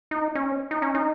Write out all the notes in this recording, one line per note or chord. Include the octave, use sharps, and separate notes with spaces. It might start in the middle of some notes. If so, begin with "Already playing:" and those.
D#4
C#4
D#4
C#4
D#4